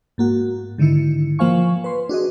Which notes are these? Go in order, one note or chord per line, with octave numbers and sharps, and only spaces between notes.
G#2 A#3 F#4
G#2 D3 D#3 E4 C#7
F3 A#3 C5 F5 G#5 C#6
B4 C6
D4 F#4 G#4 D#5